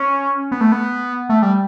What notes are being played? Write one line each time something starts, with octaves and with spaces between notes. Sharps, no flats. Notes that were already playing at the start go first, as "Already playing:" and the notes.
Already playing: C#4
B3
A3
B3
A3
G3